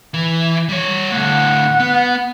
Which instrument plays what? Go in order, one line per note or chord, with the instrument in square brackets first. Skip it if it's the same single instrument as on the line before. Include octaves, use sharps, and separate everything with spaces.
[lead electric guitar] E3
G3 C#5
[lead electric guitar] A2 D3 [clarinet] F#5
[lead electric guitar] B3